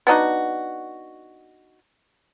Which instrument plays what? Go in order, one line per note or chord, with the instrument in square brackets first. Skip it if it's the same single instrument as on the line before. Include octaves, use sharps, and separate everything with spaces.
[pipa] B3 D4 D#4 F#4